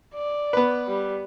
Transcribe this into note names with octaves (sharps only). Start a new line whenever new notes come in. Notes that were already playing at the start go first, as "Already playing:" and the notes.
D5
B3 B4
G3